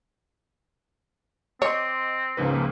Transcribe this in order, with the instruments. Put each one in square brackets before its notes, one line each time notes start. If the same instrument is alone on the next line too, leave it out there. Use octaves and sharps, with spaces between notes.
[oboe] C4 [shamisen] C#5 [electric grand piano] D#5 C6 D6
[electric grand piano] C#2 G#2 B4 [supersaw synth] C#3 F3 A#3